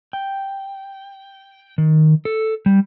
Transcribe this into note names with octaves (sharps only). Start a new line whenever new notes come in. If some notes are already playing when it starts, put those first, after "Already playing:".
G5
D#3
A4
G3